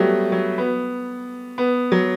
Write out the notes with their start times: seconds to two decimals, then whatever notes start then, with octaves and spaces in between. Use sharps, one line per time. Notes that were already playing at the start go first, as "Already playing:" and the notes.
Already playing: F#3 G3 A3 B3
0.32 F#3
0.58 B3
1.58 B3
1.92 F#3